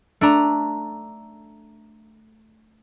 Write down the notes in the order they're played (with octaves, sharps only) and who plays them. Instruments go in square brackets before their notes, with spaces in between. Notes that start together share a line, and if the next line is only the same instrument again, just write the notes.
[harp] A3 D4 A#5